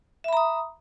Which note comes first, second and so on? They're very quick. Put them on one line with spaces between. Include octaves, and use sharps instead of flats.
E5 B5 A#5 D#6